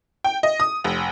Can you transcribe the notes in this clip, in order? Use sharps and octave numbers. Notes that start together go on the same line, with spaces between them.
G5
D#5
D#6
F1